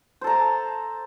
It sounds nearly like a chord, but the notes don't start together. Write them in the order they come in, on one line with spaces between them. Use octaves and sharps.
C5 A4 A#5 A5